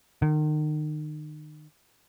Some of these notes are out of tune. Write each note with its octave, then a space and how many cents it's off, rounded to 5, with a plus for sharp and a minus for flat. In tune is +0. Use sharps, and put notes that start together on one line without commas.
D#3 -35